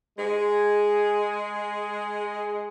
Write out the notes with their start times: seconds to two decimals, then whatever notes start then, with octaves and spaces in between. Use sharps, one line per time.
0.19 G#3 G#4